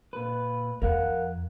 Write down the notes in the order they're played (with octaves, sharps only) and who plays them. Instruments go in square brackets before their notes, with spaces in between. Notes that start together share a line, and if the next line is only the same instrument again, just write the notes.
[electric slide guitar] A#2 B4
[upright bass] F2 [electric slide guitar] A#4 F5 F#5